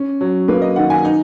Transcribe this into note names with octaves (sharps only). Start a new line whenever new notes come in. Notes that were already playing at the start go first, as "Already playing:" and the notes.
Already playing: C#4
F#3
A#3 B4
D#5
D#3 F#5
G#5
D#4